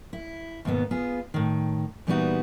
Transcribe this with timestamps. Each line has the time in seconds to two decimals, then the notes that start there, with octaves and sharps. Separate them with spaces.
0.13 E4
0.65 D#2 G#2 B2 B3
0.91 B3 F4 G#4
1.34 A2 D#3
2.07 A#2 E3 G3 B3 D#4 F#4